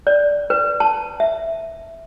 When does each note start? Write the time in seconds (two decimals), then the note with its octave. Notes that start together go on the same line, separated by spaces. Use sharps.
0.07 D5
0.50 B4
0.80 A5
1.20 E5